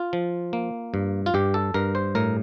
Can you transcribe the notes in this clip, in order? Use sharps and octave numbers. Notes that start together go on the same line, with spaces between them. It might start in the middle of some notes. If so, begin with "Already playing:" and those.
Already playing: F4
F3
A#3
G2
F4
G2 G4
A4
G2 A#4
C5
A2 A#4